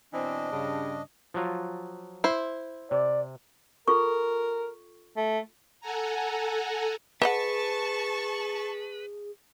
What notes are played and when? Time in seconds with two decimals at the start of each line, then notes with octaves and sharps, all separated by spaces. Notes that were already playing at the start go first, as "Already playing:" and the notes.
0.13 B2 E3 C4 D4 D#5
0.51 G2 C#3
1.34 F3 F#3 F4
2.24 E4 C5
2.91 C3 D5
3.88 F4 A4 A#4 C#6
5.17 A3
5.81 A4 F#5 G#5 A#5
7.22 G#4 B4 C5 D#5 F#5 A5 C#6